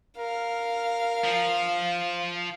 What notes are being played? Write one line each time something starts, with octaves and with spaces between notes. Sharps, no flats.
A#4 F5
F3